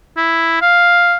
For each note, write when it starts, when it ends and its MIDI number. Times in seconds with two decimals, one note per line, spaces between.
0.17 0.58 64
0.62 1.16 77